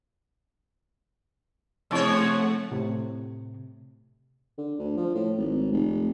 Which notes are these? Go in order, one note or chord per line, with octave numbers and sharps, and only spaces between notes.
C3 F3 A3 C4 E4 C#5 F#5
A2 C3
D3
D2
F3
A2
G#1
F1